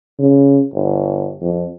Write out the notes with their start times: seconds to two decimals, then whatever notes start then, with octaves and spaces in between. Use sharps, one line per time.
0.19 C#3
0.74 G1
1.41 F2